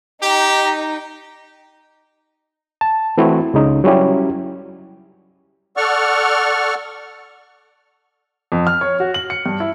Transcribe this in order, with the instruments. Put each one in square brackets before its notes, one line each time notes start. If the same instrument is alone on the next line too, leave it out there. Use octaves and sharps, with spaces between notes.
[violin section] D#4 [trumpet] G4
[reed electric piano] A5
E3 A3 C4 E4 F#4
C#2 C#3 D#4
F#3 G3 C#4 E4 G4
[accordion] A4 D5 F#5 C#6 F6
[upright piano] F2
F6
C#5
F#4
F#7
C#7
G2
E4